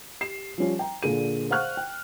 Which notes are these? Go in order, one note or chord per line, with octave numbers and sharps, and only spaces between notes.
G4 C7 E7
F3 G3 C#4 F4
G5 A#5
A#2 D3 G#4 D#7
C5 F5 F#5 C#6 F6 F#6
G5